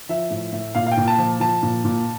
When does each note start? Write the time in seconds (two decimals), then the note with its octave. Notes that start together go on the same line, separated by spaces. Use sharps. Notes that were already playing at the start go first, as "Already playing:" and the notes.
0.09 F3 E5
0.31 A2
0.53 A2
0.75 A#2 F5
0.87 F5
0.92 G5
0.97 A#2
1.08 A5
1.18 F3
1.40 F3 A5
1.63 A#2
1.85 A#2